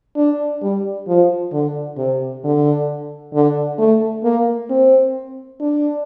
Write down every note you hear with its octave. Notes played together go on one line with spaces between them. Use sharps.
D4
G3
F3
D3
C3
D3
D3
A3
A#3
C4
D4